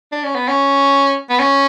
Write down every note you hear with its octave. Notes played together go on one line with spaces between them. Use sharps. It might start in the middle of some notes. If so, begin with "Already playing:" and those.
D4
C#4
B3
C#4
B3
C#4